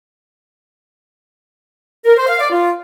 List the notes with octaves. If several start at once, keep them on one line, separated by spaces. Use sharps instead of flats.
A#4
C5
F5
D5
F4